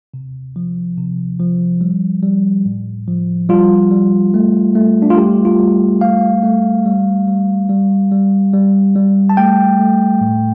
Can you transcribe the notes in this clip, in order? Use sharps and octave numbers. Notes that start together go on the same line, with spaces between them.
C3
F3
C3
F3
G3
G3
A2
F3
G3 F4
G3
A3
A3
D4
F4
G3 G4
F4
G3
A3 F5
A3
G3
G3
G3
G3
G3
G3
A5
A3 G5
A3
A2